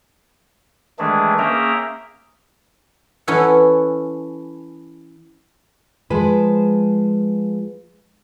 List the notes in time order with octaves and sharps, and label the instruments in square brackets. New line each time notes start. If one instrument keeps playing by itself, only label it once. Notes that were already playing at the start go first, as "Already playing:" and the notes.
[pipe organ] D#3 E3 G#3 A3 D4 G#4
A#3 C#4 G#4 E5 G5 A#5
[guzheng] E3 C#4 E4 A4 C#5 F#5
[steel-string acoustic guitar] F3 G#3 B4 C5